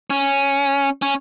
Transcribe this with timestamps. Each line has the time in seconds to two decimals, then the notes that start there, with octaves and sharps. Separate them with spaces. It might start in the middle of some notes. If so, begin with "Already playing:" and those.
0.10 C#4
1.02 C#4